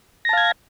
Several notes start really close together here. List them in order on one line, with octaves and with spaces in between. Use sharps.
A#6 A5 F5 G#6